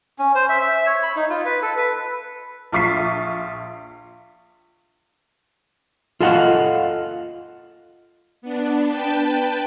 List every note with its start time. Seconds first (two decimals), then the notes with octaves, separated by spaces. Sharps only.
0.19 C#4
0.35 C5
0.49 E5
0.61 E5
0.86 C#5
1.03 B5
1.16 D#4
1.30 F4
1.45 B4
1.62 A4
1.77 B4
2.72 A#1 F4 C#6 B6 C7
6.20 F4 A4 D#5 F5 F#5
8.42 B3 D4
8.86 B4 G5 A5